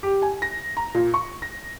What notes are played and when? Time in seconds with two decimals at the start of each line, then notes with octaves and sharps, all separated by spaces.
0.03 G4
0.22 G#5
0.42 A#6
0.77 A#5
0.95 A#2
1.14 C#6
1.42 A#6